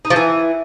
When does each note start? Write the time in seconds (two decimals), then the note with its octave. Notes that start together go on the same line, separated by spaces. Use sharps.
0.05 D#4
0.10 F3
0.16 E3